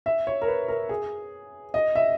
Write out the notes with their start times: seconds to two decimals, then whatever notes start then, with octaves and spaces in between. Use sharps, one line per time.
0.06 E5
0.27 C#5
0.42 A#4
0.48 B4
0.68 A#4
0.89 G#4
1.74 D#5
1.96 E5